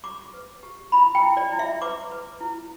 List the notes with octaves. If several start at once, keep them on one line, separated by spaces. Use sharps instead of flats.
G4 D6
B4
G4
E4 B5
G5
E4
D5
E4
E5
B4 D6
B4
E4